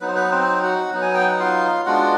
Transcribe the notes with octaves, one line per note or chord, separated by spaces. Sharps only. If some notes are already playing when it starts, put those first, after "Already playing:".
F#3 B3 D#4 B4
C5
B3 B4
C4 C5
F#4 F#5
F#3 B3 D#4
G#5
G5
F#5
F4 F5
G#3 B3 D4 F4 F#4 F#5